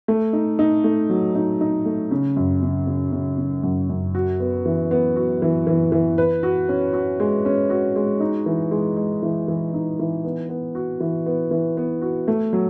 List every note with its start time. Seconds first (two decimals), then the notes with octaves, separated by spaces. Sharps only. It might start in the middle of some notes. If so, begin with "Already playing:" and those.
0.08 A3
0.33 D#4
0.59 D#4
0.84 A3
1.10 F#3
1.35 D#4
1.61 D#4
1.85 A3
2.11 C#3
2.36 F#2
2.63 C#3
2.87 C#3
3.12 C#3
3.38 C#3
3.63 F#2
3.89 F#2
4.15 F#4
4.40 B3
4.65 E3
4.91 B3
5.16 F#4
5.42 E3
5.67 E3
5.92 E3
6.18 B4
6.43 F#4
6.69 C#4
6.93 F#4
7.20 G#3
7.45 C#4
7.70 F#4
7.96 G#3
8.20 D#4
8.46 E3
8.71 G#3
8.97 G#3
9.23 E3
9.48 E3
9.74 D#4
9.99 E3
10.25 B3
10.49 B3
10.75 F#4
11.00 E3
11.26 B3
11.51 E3
11.77 B3
12.02 F#4
12.28 A3
12.53 F#3